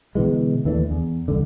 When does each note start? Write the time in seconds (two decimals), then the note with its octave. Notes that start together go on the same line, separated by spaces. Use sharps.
0.15 B2 D3 E3 G#3
0.65 D#2 E3 A3 D4
0.91 E2
1.28 C2 D3